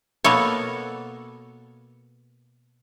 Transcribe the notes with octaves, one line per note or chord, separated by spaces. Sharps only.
B2 A#3 B3 A4 C#5